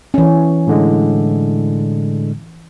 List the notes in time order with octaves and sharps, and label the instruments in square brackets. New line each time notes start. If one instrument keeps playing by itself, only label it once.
[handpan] E3 C#4
[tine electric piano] A2 D3 G#3